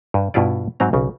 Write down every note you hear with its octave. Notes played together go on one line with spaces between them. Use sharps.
G2
G2 B2 E4 F4 D5
G#2 F#3 C4 A#5
B1 C#3